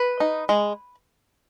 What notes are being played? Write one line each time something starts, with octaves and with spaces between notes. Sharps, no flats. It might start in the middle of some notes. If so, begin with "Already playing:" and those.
Already playing: B4
D#4
G#3